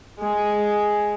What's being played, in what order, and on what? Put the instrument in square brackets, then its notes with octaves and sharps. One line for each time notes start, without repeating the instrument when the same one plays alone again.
[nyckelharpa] G#3 G#4